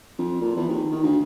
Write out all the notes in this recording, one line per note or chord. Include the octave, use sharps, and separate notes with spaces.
F2
A#2
E2
D#2
D#3
D2